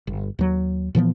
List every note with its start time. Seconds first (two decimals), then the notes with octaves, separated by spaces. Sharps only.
0.07 G1
0.39 D#2 F#3
0.95 A#2 E3 F3 B3